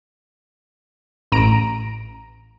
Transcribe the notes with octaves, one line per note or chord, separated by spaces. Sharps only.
A1 A#5 D7